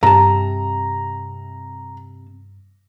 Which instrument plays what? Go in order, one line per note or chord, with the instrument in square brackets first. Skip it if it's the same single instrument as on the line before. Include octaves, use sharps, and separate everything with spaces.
[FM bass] G2 [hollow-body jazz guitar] C3 A5 [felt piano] A#5